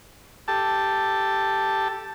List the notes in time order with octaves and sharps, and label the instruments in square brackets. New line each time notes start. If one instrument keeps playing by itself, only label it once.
[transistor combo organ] G4 A4 A5